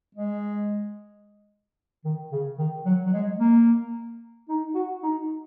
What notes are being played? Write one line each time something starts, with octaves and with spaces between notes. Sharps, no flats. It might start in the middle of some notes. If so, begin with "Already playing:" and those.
G#3
D#3
C#3
D#3
F#3
F#3
G#3
A#3
D#4
F#4
D#4